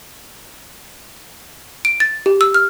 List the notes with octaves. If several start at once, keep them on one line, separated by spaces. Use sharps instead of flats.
D7
A6
G4
E6
F6